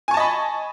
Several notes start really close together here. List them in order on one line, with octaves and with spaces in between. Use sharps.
G#5 C#6 A5 D#5 B5